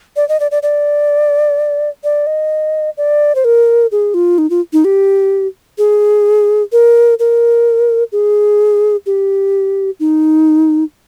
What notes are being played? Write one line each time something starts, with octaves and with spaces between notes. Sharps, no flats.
D5
D#5
D5
D5
D5
D5
D#5
D5
C5
A#4
G#4
F4
D#4
F4
D#4
G4
G#4
A#4
A#4
G#4
G4
D#4